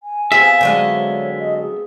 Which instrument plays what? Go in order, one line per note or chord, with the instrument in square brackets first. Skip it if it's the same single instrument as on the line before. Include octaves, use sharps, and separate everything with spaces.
[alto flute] G#5
[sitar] B3 C4 F4 [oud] G#4 [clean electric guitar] E5
[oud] D3 F#3 G#3
[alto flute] C#5
D#5
G#4